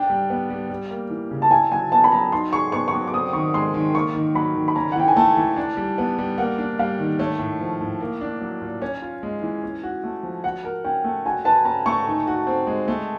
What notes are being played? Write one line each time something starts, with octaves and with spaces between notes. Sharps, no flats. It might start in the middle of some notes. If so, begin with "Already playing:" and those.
Already playing: D4 G5
G3
B3
G3
G3
A#3
E3
C#3
A5
E4 G#5
F#3 G#5
B3 A5
B5
F#3 A#5
D#4 C6
G#4 C#6
B3 C#6
C#6
F#3 D6
D6
C4 D#6
D#3 C#6
G#3 C6
D#3
A#3 C#6
D#3
F#3 B5
D#3
B5
C#4 A#5
F#5
E3 G5
G#5
A3 A5
E3
D4
G3
B3
G3
A#3 F#5
D4
G3 F5
D#3
A3 C#5
A2
F3
A2
A#3
D4
F#3
A#2
C#4 C#5
F4
G#3
E3
C#4
F#4
A3
F3
F#4 F#5
A#4
C#4 G5
A3
F#4 G#5
B4 A5
C#4 A#5
A3 C#6
D#4
F#4
C4
G#3
A3